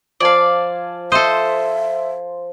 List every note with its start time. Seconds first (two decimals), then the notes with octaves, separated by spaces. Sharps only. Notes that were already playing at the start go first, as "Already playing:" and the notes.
0.20 F3 D5 F5 G#5 A5
1.12 A4 C5 D#5 E5 C6